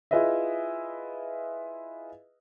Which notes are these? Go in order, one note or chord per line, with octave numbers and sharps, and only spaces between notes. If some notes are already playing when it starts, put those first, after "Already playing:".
E4 F4 G#4 B4 D#5 E5